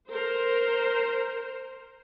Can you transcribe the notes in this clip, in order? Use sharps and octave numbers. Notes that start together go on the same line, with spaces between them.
A#4 C5